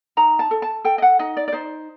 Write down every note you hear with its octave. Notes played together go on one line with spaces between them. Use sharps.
D#4 A#5
A5
A4
A5
A4 G5
D#5
F#5
D#4 D#5
D5
D5
D#4 C5